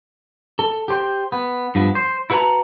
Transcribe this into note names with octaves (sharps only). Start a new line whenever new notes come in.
A4
G4 C5 G5
B3
G2 F3 B3
C5
E4 F#4 B4 E5 A5 A#5